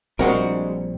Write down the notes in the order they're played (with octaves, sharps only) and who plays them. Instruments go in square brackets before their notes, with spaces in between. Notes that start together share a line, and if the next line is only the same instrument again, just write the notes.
[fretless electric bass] A#1 G3 C4 [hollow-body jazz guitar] G#3 F#4 A#4